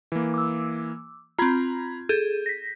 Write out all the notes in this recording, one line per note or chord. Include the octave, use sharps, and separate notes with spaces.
E3 A#3
D6 E6
C4 F4 A#5 B5 G#6
G#4 A4 G6
A#6 B6